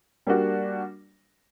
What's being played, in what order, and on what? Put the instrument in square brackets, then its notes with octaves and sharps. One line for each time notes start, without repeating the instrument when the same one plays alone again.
[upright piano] G3 A#3 D4 F#4